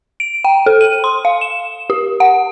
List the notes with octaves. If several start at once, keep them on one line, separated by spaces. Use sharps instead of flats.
D7
G5
A4
D#7
C6
F5
E7
G4
F#5